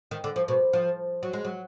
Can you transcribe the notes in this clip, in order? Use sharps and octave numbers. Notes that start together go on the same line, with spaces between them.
D#3
D3
F3
B2
F3
F#3
G#3
F#3